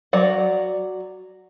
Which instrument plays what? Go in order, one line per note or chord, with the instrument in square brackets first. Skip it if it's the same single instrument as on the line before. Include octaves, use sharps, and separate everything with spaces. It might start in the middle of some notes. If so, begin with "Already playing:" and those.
[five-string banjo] F#3 D5 F#5